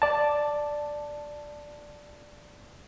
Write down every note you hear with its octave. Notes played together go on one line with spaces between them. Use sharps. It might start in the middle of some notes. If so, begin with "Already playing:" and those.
D5 A5